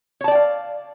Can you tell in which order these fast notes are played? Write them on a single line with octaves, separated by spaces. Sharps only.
C#5 A5 D5 G5 F5